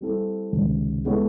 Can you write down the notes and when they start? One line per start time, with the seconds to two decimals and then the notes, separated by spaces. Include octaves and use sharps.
0.01 G3 C4 E4 A4
0.52 C#2 C3 D#3
1.05 G#3 B3 E4 A4 C#5